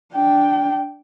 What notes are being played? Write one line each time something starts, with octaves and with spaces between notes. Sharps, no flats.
D4 G5